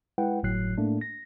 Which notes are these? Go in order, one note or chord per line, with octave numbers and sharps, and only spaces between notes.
G#3 E4 B4 F#5 G5
G1 A2 F#3 F#6 C7
A2 A3 A#3 D4
A#6